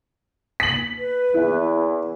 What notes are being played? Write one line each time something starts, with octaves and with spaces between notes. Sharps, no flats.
B6 F#7
B4
E2 E4